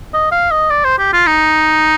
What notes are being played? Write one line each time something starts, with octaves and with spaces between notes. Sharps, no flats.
D#5
F5
D#5
D5
C5
G4
F4
D#4